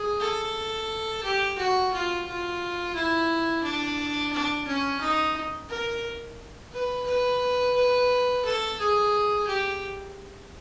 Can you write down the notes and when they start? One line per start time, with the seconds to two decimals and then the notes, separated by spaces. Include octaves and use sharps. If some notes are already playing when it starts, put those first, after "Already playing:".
Already playing: G#4
0.20 A4
1.23 G4
1.58 F#4
1.92 F4
2.27 F4
2.94 E4
3.63 D4
4.32 D4
4.67 C#4
5.00 D#4
5.69 A#4
6.72 B4
7.07 B4
7.76 B4
8.45 A4
8.79 G#4
9.47 G4